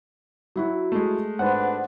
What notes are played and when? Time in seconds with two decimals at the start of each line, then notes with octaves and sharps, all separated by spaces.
0.56 F#3 E4 F#4
0.92 G#3 A3
1.39 G#1 G#2 D4 B4 C5 F#5